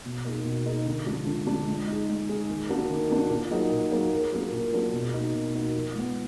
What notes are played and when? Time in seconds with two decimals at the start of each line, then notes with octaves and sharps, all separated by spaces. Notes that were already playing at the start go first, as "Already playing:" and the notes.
0.05 B2
0.25 A#3 D#4 G#4
0.45 B2
0.65 A#3 D#4 G#4
0.86 D3
1.06 F3 G#3 D4
1.26 D3
1.47 F3 G#3 D4
1.67 G#3
1.87 D#4 G#4
2.08 G#3
2.29 D#4 G#4
2.49 D#3
2.69 A#3 D4 F#4
2.90 D#3
3.09 A#3 D4 F#4
3.30 A#2
3.51 F#3 A#3 D#4 G#4
3.71 A#2
3.91 F#3 A#3 D#4 G#4
4.12 A#2
4.32 F#3 A#3 D4 G#4
4.52 A#2
4.73 F#3 A#3 D4 G#4
4.93 B2
5.13 A#3 D#4 F#4
5.34 B2
5.54 A#3 D#4 F#4
5.75 F3
5.95 G#3 B3